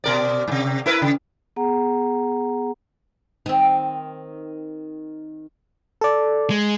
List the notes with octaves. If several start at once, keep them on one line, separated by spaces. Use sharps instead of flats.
B2 A#4 D5
G#2 C3
E4 A#4 B4
C#3
B3 G#4 F#5 A#5
D#3 C4
A4 D5
G#3